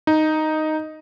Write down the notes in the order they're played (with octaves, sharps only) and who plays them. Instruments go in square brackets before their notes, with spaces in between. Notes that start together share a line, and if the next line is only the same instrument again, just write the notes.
[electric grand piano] D#4